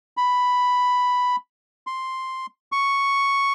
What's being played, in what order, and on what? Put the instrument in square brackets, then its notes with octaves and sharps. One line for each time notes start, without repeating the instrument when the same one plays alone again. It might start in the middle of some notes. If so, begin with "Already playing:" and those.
[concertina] B5
C6
C#6